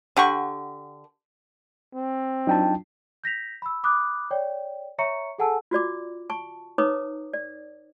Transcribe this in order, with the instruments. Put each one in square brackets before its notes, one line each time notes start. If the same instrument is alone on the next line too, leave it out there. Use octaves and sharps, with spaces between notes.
[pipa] D3 G4 F#5 C#6
[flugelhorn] C4
[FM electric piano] F#3 D4 F4 [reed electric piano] D#4 G5 A5
[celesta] G6 A#6 B6 F7
B5 E6
B5 D6 D#6 F#6
C#5 D5 G5
C#5 E5 A#5 C#6 C#7
G#4 A4 F#5 G#5 A5 E6
[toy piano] F4 F#4 D5 D6
A5 C#6
D#4 B4 C#5 A#5 D6 D#6
D5